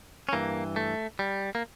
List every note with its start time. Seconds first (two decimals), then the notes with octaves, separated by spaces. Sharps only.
0.29 C#4
0.33 G2 E3 A#3
0.76 A3
1.19 G3
1.55 A#3